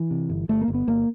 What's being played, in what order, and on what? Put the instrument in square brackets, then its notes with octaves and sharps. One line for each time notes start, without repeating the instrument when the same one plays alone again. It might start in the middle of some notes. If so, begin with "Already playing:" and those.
Already playing: [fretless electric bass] E3
C3
G1
G1 A3
A#3
G1
B3
G1 A#3